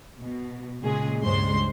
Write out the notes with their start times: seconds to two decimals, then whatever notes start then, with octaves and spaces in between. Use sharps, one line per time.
0.20 B2
0.82 A#2 C#3 G#3 G#4
1.22 C#2 G2 C#3 G#3 C5 C6